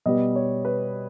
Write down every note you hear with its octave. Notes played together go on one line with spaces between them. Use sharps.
B2 G3 B3 D#5
C#5
B4